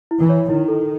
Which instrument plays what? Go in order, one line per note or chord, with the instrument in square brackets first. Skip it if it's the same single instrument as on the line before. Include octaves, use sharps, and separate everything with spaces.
[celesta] E4
[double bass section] E3
[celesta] C#5
[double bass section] D#3 [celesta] E4
[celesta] A4